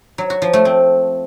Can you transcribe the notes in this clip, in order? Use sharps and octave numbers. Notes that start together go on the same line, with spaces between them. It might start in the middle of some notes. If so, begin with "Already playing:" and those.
F#3
F#4
F3
A3
C4